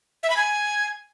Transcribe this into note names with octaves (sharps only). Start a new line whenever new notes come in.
E5
B5
G#5